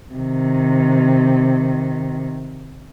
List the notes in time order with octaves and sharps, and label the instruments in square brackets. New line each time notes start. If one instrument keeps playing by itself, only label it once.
[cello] C3 D#3